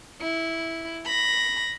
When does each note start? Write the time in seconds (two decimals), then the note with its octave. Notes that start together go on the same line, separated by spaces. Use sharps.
0.21 E4
1.05 B5 A#6